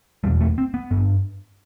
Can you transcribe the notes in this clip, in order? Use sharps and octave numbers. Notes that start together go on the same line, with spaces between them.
E2 B2 G3
A3
C4
B3
G2